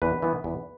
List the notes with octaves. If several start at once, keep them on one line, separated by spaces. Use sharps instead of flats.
E2 B4
E3 B3
E2